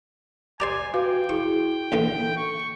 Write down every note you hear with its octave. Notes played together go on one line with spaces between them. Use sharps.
G4 C5 D5 G#5 A#5 D6
F#4 B4 F5 G5
E4 G#4 C#6
A#1 D3 E3
C#6